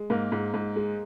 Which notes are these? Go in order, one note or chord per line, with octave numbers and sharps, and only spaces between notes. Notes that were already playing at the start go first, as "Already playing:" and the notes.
Already playing: G#3
G#2 A#3 A#4
G#2
G#2
G#3